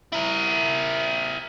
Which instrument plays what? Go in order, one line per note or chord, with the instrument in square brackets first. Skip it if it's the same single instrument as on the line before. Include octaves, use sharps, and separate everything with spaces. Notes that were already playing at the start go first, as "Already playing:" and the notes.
[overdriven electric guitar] E4 A#4